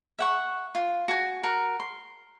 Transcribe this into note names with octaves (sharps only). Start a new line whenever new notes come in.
E5 F#5 C#6
F4
F#4 G#5
F#4 A#4
C6